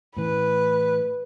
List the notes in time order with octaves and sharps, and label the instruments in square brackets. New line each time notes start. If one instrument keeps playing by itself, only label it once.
[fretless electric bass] A2 E3 [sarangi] B4